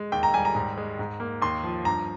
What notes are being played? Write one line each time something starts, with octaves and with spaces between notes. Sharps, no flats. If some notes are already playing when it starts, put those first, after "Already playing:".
Already playing: G#3
D#2 G5
A#5
G3 G#5
A#5
G#2
G#3
G#2
A#3
D#2 C6
F3
G2 A#5